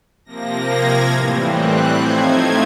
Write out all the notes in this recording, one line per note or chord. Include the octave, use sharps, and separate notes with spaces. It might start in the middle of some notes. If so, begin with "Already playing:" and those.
C3 F3 A#3 A#6
G#6
A2 E3 G3 C4
F#6
A2 F3 A3 C4 D#4 G#6